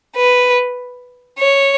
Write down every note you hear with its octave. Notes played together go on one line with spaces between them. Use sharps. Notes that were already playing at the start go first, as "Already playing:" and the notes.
B4
C#5